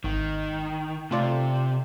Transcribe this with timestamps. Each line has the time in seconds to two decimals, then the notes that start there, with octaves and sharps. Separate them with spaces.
0.04 G#1 D#3
1.11 C3 A3 F4 D5